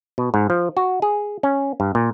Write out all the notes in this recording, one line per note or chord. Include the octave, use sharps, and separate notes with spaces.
B2
G#2
F3
F#4
G#4
C#4
G2
A#2